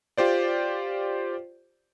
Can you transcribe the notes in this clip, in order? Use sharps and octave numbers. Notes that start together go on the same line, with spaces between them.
F4 G4 C5 D5